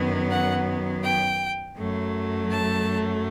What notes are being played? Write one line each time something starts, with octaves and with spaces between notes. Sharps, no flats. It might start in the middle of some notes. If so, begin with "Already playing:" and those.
Already playing: F#2 D#3 F#3 B3
F#5
G5
F#2 F#3 A3
A5